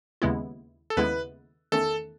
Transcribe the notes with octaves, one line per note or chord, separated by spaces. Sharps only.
D#2 C#3 G#3 B3 E4
A4
D#2 C#3 G#3 B3 E4 B4
E2 D#3 A3 C#4 A4